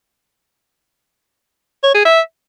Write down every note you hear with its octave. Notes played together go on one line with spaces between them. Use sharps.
C#5
G#4
E5